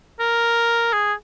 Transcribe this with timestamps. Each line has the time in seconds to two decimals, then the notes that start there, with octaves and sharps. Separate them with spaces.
0.20 A#4
0.93 G#4